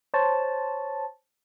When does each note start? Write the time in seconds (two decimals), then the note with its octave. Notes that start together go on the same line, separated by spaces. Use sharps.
0.14 C5 C#5 A5